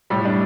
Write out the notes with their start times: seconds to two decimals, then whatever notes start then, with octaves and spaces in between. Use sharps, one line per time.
0.10 A2 G3
0.25 D4